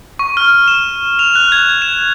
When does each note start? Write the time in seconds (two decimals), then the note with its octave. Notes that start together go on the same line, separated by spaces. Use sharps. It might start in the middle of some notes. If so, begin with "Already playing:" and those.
0.19 C#6
0.37 F6
0.68 E7
1.19 F7
1.35 F#6
1.52 G#6
1.82 E7